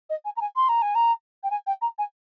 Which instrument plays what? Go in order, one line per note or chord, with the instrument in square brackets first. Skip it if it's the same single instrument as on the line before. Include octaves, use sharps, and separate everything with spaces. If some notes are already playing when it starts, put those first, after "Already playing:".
[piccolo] D#5
G#5
A#5
G#5
C6
A#5
G#5
A#5
G5
G#5
G5
A#5
G#5